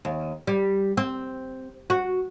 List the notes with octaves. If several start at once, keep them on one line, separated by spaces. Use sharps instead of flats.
D#2
G3
C4
F#4